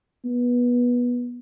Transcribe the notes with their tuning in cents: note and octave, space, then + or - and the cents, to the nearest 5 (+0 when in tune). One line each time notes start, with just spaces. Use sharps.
B3 -20